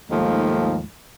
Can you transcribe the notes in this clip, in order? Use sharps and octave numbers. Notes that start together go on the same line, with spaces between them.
D#2 G#2 F3 A3